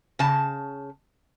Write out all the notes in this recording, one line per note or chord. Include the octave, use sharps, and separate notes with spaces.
C#3 A5